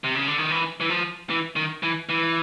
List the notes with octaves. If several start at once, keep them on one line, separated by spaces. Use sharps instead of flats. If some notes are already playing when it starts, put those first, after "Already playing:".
C3
C#3
D3
D#3
E3
E3
F3
E3
D#3
E3
E3